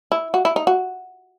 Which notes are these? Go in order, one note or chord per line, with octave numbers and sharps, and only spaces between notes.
E4
F#4
E4
D#4
F#4